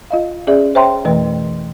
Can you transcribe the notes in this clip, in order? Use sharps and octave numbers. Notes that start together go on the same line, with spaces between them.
F4 D#5 F5
C#4 G#4 D5 E5
C5 C#5 E5 G5 A#5 C6
F2 B2 E3 A3 B4